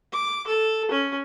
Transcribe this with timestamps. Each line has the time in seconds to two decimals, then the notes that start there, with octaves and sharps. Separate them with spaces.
0.13 D6
0.47 A4
0.91 C#4